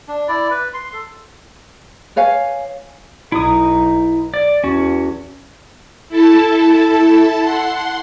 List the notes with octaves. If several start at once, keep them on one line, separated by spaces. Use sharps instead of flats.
D4
E4 D5
B4
C6
A4
B4 C#5 F5 G#5
B1 D#4 E4 D#6
D5
E2 C#4 F#4
E4 A4 A5
F#5 C6